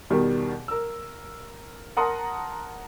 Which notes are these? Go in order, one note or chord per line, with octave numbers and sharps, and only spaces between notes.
E2 B2 D#3 G3
A#4 E6
A#4 F#5 A5 A#5 C6 D#6